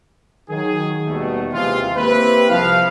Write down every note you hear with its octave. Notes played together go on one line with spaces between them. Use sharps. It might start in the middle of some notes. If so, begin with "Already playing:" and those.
D#3 F#3 G#4
D#2 B2 D#3 G3 A3
D#2 C3 E3 G#3 F4
A#3 C4 E4 G4 B4
C2 F3 F5